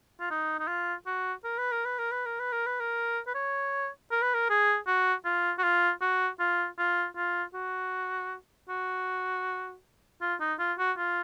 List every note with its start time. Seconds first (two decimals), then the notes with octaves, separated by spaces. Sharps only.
0.20 F4
0.31 D#4
0.59 D#4
0.68 F4
1.07 F#4
1.44 A#4
1.58 B4
1.72 A#4
1.85 B4
1.99 A#4
2.11 B4
2.26 A#4
2.40 B4
2.52 A#4
2.66 B4
2.80 A#4
3.27 B4
3.35 C#5
4.11 A#4
4.22 B4
4.34 A#4
4.50 G#4
4.87 F#4
5.25 F4
5.59 F#4
5.64 F4
6.01 F#4
6.40 F4
6.79 F4
7.17 F4
7.54 F#4
8.69 F#4
10.22 F4
10.40 D#4
10.59 F4
10.78 F#4
10.98 F4